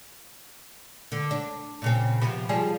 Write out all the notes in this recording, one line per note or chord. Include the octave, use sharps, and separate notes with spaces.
D3
D4
A#2 C#3 C4
C3 F3 B3
F3 G3 G#4